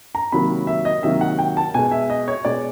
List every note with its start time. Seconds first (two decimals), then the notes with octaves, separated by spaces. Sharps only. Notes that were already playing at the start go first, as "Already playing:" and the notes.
0.15 A#5
0.32 C3 D#3 F#3 A#3 B5
0.67 E5
0.85 D#5
1.03 C3 D#3 F#3 A#3 E5
1.21 F#5
1.38 G5
1.57 A5
1.74 B2 G#3 G#5
1.91 E5
2.10 D#5
2.28 C#5
2.45 B2 G#3 D5